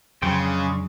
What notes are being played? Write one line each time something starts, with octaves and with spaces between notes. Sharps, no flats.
F2 C#3 F#3 C5 G5
G#3 D4